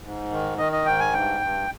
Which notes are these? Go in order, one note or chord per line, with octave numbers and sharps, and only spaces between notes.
G#2
D#3
D#3 D#5
D#5
G#2 G5
G#5
G2 G5
G2